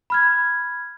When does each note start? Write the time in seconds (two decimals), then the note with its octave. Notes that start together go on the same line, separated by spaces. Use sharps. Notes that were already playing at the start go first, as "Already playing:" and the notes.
0.10 B5 F6 G#6